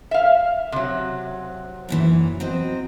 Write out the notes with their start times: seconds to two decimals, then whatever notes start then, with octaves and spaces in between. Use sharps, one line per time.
0.11 E5 F5
0.72 C3 F#3
1.89 F#2 A#2 E3
2.40 F#3 C4 D#5